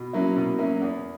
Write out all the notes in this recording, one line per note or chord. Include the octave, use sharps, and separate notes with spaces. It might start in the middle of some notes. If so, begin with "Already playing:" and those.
Already playing: B2
F#3 A#3 C#4 E4
B2
F#3 A#3 C#4 E4
E2